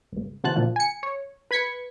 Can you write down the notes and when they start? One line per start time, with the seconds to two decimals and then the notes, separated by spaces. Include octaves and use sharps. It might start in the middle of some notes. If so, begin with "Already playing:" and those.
0.12 G#1 C#2
0.44 C#3 E3 F#4 C5 A5 F#6
0.56 D2 A#2 F3 A#3
0.76 G#5 C#7
1.03 C#5
1.51 B4 B5 G#6 B6 C#7